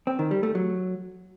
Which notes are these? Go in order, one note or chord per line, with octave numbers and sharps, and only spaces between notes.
C4
D#3
G3
A3
F#3